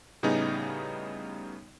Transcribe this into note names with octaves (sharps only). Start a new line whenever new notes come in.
A2 C#3 G3 B3 D#4 G#4